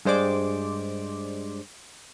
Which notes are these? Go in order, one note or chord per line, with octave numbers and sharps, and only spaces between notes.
G2 G#3 C5 D5 D6